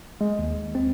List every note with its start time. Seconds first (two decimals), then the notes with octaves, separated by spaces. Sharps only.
0.21 G#3
0.39 D#2
0.75 C4